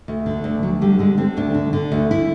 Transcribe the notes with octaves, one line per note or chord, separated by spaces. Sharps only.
D2
D3
D2
D2 F#3
D3 G3
D3 G#3
D3 C4
D2 D4
D3
D3
D2
E4